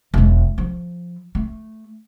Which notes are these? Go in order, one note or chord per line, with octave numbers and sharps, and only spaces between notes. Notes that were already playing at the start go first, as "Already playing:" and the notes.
E1 G#3
F3
A3